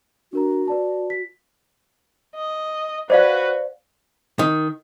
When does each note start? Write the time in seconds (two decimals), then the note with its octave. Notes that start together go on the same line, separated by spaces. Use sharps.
0.33 D4 F#4 A#4 A#5
0.68 B4 D5 A5
1.10 B6
2.35 D#5
3.10 F#4 B4 C5 D5 F5
4.39 D#3